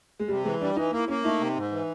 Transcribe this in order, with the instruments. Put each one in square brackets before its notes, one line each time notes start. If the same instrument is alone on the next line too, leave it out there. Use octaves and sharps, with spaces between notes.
[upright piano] G#3
[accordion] C3 [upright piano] G3
[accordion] E3 [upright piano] G#3
[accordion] G3 [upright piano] D4
[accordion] E3 [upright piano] D#4
[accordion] A#3 [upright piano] E4
[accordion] A#3 [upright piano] C#4
[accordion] A3 [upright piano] D#4
[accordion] C3
G#2
E3